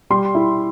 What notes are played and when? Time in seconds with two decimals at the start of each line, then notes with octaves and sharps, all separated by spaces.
0.10 G3 C6
0.35 E4